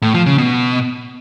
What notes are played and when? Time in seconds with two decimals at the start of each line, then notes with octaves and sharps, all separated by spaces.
0.02 A2
0.14 F3
0.26 C#3
0.38 B2